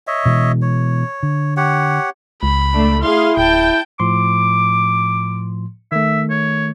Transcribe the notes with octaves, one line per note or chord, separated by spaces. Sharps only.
C#5 D#5 E5
B2 E3 G#3
C#5
D3
G4 C#5 F#5
C#2 B5
A3 D4
E4 G#4 F5 C6
D1 G5 A5 G6
A2 F3 C6 D6
D#3 A3 E5
C#5